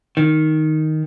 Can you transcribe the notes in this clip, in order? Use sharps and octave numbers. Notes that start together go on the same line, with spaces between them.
D#3